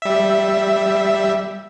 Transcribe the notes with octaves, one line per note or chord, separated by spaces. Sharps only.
G3 E5